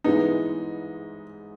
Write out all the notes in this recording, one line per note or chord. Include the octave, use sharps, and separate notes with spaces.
G#2 E3 G#3 B3 D#4